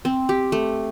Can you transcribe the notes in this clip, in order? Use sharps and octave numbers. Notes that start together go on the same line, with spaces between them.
C4
G4
A3